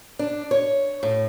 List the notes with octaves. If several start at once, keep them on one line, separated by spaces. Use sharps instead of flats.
D4
C#5
A2